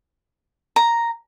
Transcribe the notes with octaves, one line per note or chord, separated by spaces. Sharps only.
A#5